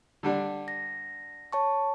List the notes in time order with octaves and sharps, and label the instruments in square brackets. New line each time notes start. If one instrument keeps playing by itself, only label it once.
[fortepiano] D3 G3 D4
[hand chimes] A#6
C#5 A5 C#6